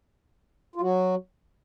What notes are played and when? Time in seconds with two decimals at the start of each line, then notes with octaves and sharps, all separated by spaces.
0.76 F4
0.81 F#3 F#4